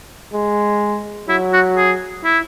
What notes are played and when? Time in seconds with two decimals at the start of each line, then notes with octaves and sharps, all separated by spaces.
0.33 G#3
1.29 F#3 E4
1.53 F#4
1.77 G#4
2.24 E4